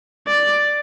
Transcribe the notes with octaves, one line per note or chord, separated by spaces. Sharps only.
D5